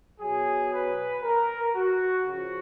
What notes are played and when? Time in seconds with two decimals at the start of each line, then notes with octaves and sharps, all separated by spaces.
0.20 B2 F#3 G#4
0.71 B4
1.23 A#4
1.75 F#4
2.26 C#3 F3 F#4